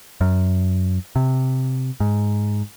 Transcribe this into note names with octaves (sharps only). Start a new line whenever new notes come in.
F#2
C3
G#2